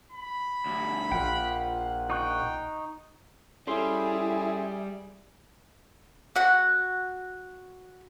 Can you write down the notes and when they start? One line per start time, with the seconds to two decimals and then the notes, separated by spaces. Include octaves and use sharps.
0.12 B5
0.66 D2 G2
1.12 A#1 F4 F#5 G5
2.10 D#4 G5 C#6 F#6
3.67 G3 C#4 E4 G#4 A4 E5 C6
6.36 F#4 F#5